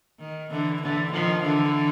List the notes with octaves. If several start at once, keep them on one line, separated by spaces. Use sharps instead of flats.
D#3
D3 E3
D3 E3
D#3 F3
D3 E3